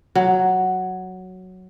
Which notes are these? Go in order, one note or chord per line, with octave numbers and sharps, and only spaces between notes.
F#3